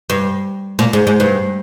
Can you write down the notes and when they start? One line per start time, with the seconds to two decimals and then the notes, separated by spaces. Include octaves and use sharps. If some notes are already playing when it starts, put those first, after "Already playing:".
0.10 G2
0.79 A#2
0.93 G#2
1.07 G#2
1.20 G2